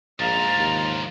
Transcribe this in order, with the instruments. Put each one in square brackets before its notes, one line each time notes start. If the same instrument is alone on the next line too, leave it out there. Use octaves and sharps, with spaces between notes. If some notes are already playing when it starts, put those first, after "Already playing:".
[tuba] A#1 [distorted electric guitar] G#2 F3 [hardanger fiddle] F5 A#5 [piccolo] A6
[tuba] D#2